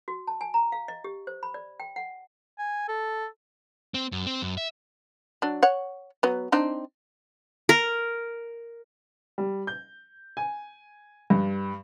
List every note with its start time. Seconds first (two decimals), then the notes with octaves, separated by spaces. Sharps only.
0.08 F#4
0.27 A5
0.41 G#5
0.54 A#5
0.72 F5
0.88 D#5
1.04 G4
1.27 C5
1.43 B5
1.54 D5
1.80 G5
1.96 F#5
2.59 G#5
2.89 A4
3.94 C4
4.12 F#2
4.26 C4
4.42 F#2
4.57 E5
5.42 F#3 D4
5.63 C#5 F#5
6.23 F#3 B3
6.52 C4 D4 D#4
7.69 A#4
9.38 G3
9.67 G6
10.37 G#5
11.30 G2